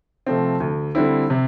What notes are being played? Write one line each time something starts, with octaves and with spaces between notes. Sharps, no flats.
C3 F3 A3 C4
D2
D3 G3 C4 E4
C3